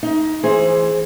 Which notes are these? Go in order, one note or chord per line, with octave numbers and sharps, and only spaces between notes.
D#4
E3 G#4 C5